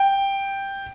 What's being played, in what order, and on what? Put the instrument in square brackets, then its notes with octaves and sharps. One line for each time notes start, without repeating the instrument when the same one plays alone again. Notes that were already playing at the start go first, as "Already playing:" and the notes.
Already playing: [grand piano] G5